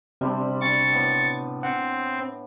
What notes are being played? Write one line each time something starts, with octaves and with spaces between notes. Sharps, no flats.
C3 G3 C4 D4
D4 G5 C#6 A6
A2 B3
C4 F#5